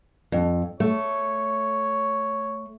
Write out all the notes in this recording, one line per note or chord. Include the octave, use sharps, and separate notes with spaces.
F2
A3 C#5